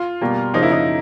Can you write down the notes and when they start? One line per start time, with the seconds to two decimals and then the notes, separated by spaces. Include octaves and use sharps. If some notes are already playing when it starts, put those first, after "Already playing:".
Already playing: F4
0.21 B2 G3 A#3
0.54 C#3 F3 A#3 D#4
0.63 E4
0.71 D#4